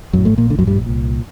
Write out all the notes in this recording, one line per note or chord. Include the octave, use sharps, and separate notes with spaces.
A#1 F#2 A2 F#3
A2 A3
A#2 A#3
A#1 F#2 A2 D3 F#3
G2 G3
C2 A#2